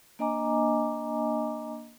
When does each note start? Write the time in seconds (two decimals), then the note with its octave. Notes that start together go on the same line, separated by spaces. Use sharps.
0.19 A#3 D4 D#5 G#5 A#5 D6